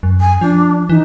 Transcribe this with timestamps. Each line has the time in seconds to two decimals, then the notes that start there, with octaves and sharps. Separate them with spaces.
0.03 F#2
0.21 G#5
0.41 F3 D4
0.89 E3 D#4